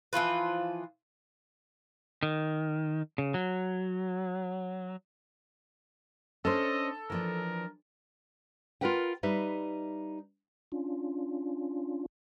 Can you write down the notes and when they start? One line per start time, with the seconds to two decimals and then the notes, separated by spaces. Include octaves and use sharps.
0.13 E3 F3 F4 B4
2.23 D#3
3.18 C#3
3.34 F#3
6.45 C#4 D4 A4 C5 D#5
7.10 E3 F3 D4 A#4
8.81 F4 F#4 A#4 B4 F#5 G5
9.23 G3 D#4 B4 E5
10.72 C#4 D4 F4